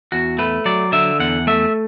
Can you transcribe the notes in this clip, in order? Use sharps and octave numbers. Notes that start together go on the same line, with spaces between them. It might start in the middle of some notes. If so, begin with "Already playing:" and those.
E2 F#4
A3 B4
F#3 D5
D3 E5
E2 F#5
A3 E5